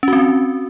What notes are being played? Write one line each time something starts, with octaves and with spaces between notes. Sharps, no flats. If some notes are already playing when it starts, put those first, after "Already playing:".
C4 C#4 F#4